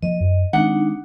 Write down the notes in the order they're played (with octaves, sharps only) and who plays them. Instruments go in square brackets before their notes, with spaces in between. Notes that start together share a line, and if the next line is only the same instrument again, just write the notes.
[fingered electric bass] F3 A#3 [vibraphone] D#5
[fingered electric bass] F#2
[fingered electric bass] D#3 G#3 C4 [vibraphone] D4 D#4 [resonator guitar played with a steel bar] F#5